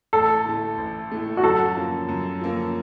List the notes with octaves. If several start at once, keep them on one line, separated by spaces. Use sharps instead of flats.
A1 A4
A2 A3
A1
A2 A3
F#4
F#2 A4
F3 A#3 C#4
F#2
F3 A#3 C#4